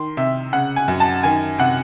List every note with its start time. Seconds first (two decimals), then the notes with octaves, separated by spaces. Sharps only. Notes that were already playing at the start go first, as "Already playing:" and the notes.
Already playing: D#3 C6
0.17 C3 E5
0.53 C#3 F#5
0.76 G#5
0.88 F#2
1.00 A5
1.23 D#3 G#5
1.58 C3 F#5